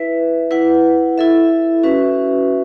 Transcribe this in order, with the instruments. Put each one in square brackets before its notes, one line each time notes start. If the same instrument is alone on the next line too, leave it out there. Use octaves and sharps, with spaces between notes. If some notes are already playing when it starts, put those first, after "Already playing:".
Already playing: [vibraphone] E4 B4 E5
E4 B4 F#5
E4 A4 E5
C#4 F#4 B4 E5